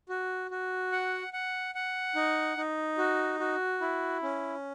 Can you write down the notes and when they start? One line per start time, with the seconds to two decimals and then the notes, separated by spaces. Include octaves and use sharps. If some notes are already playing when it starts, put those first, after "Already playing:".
0.09 F#4
0.51 F#4
0.92 F#5
1.33 F#5
1.75 F#5
2.16 D#4
2.57 D#4
2.98 F#4
3.40 F#4
3.81 E4
4.23 C#4